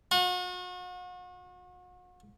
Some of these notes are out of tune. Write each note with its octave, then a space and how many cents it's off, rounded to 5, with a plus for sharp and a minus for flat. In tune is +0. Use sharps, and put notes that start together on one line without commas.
F#4 -40